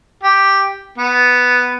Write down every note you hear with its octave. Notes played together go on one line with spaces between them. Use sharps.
G4
B3